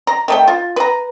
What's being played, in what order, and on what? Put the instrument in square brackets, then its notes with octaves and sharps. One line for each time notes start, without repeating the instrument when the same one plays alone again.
[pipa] A#5
D#3 A3 G5
F4
B4 A#5